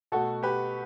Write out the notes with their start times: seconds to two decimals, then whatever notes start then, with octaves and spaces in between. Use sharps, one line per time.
0.12 B2 A3 F#4 A4
0.43 G4 B4